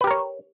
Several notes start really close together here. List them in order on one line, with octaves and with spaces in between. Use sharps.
B4 G4 A#4 C#5